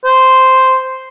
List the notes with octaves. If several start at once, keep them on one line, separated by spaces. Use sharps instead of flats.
C5